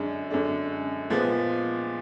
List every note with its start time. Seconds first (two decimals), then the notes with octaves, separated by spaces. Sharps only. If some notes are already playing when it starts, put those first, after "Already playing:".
Already playing: F#2 D3 G#3 D4
0.30 F#2 D3 G#3 D4
1.10 A#2 F3 G#3 B3